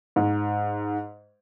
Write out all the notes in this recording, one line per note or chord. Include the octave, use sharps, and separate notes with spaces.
G#2